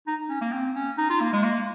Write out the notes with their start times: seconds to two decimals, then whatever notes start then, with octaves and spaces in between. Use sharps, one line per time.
0.07 D#4
0.29 C#4
0.41 A#3
0.52 C4
0.75 C#4
0.97 D#4
1.10 F4
1.21 A#3
1.33 G#3
1.44 A#3